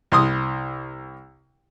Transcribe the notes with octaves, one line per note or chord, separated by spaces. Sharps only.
C2 C6 D#6